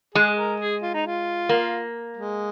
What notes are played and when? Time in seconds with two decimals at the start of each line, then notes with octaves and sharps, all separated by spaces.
0.15 G#3 G#4
0.38 A#4
0.60 G#4
0.82 F4
0.94 D#4
1.06 F4
1.49 A#3
2.16 G#3